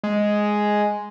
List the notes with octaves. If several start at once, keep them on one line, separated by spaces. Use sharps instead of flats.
G#3